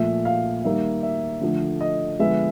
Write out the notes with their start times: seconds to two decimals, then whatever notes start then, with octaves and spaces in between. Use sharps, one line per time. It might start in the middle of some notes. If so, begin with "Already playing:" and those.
Already playing: A#2 F3 A3 E5
0.25 F5
0.64 D#3 G3 A#3 E5
1.03 E5
1.41 D3 F3 A3
1.81 D#5
2.19 D3 F3 G#3 B3 E5